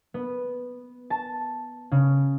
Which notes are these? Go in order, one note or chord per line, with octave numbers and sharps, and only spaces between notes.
B3
A5
C#3